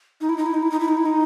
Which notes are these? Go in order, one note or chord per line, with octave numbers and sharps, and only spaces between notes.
D#4
E4
D#4
E4
D#4
E4
D#4
E4
D#4
E4
D#4